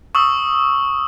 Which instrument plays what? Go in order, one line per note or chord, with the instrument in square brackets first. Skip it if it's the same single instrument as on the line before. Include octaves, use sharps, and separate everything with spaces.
[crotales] C#6 D#6 E6